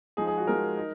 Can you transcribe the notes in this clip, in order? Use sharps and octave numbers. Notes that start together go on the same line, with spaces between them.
F3 G#3 D#4 G#4
G#4
F#4
F3 G#3 D#4 A#4
D#4